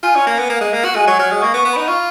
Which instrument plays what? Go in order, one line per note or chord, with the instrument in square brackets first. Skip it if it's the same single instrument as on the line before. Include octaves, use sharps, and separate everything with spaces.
[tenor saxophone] F4 [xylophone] G#5
[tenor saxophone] C#4
A#3
B3
A#3
G#3
A#3
F#4
[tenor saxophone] G#3 [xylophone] G#5
[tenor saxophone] F#3 [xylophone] C#6
[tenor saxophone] F#3 [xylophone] F6
[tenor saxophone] G#3 [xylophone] D#6
[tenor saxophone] A#3 [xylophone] C#6
[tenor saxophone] B3
[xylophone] C#6
[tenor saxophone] B3
[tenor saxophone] D#4 [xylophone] B5
[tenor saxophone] F4 [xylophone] C#6